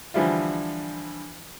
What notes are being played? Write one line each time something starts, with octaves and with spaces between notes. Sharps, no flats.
D3 E3 F3 G3 E4 F4